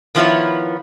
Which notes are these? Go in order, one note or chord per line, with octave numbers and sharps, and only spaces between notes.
D#3 F3 B3 E4 F4 C#5